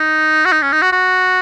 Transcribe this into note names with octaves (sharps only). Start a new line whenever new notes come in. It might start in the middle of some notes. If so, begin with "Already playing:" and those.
Already playing: D#4
F#4
D#4
C#4
D#4
F#4
F#4